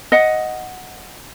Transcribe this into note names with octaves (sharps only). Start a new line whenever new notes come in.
D#5 F#5